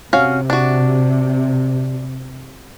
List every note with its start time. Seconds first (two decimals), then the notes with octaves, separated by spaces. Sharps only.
0.13 C3 C#4 F#4 F5
0.50 D4 F#4